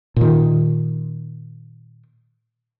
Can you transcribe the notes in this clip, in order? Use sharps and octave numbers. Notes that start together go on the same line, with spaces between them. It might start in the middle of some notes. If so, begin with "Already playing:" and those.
A#2 D#3